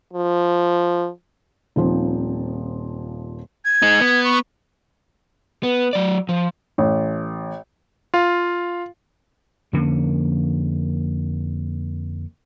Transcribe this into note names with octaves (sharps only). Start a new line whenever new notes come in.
F3
D#1 D#3 F3 C4
G#6
G#3 D#4
B3
C#6
B3
F#3 D5
F3
A1
F4 F5
F2 D3 A#3 C#4